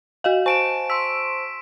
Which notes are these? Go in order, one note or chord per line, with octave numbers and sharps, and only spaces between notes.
F#4 D#5 F5
C5 G#5 A5 C#6 D7 E7
C6 E6 B6